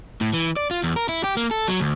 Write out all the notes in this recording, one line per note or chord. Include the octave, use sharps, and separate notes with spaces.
A2
E3
D5
F4
E2
A#4
E4
G4
A#3
A4
F#3
D2